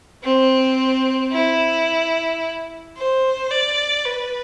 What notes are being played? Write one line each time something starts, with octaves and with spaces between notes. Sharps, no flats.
C4
E4
C5
D5
B4